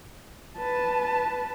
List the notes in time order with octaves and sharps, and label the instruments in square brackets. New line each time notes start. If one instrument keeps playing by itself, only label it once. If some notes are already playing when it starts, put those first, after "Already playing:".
[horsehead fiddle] B4 A5